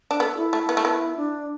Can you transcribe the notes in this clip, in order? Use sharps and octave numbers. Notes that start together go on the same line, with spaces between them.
D4
B3 A4
E4
A3
B3
A3
B3
D4